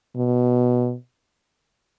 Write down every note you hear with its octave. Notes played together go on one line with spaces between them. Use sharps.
B2